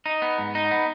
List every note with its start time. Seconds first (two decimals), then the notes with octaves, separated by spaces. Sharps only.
0.06 D#4
0.22 B3
0.39 G#2
0.55 D#4
0.71 B3